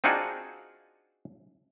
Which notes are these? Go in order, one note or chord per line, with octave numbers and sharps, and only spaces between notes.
C4 D4 D#4 F4 F#4 G#4